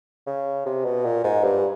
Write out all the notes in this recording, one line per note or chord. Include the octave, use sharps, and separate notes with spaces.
C#3
C3
B2
A#2
G#2
G2